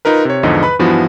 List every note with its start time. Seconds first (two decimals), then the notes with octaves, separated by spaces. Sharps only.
0.05 D#4 F4 A#4 B4
0.25 C3 C#5
0.43 E2 G#2 D3 F3 D#5
0.63 B4 B5
0.79 G2 E3 F3 B3 E4 F#4